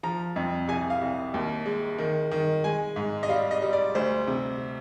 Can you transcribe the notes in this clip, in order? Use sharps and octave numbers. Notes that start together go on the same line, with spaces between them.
F3 A#5
F2
C2 G#5
F5
C2
D#2
G#3
D#3
D#3
G#3 G#5
G#2
D#5
G3 F5
D#5
G3
D5
D2 C5
C3